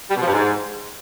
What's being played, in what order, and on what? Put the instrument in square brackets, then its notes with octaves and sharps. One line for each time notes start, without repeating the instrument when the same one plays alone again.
[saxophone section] G3
B2
F3
G2
G#2